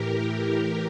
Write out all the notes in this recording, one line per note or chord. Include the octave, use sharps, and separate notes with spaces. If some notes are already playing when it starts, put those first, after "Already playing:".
Already playing: A2 E3 G4 A#4